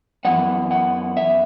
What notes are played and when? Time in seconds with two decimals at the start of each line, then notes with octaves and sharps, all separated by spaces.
0.25 F#2 E3 G#3 B3 F#5
0.71 F#5
1.17 E5